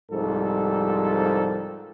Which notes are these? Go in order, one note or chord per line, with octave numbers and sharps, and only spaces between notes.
C2 G#2 F3 G3 A4 A#4